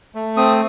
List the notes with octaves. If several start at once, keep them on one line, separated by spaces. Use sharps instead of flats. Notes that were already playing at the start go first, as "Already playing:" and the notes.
A3
C4 D#6